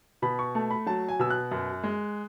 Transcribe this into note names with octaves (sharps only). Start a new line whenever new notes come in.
B2 B5
C#6
A3
B5
F#3 A5
G#5
B2 E6
F#6
F#2
G#3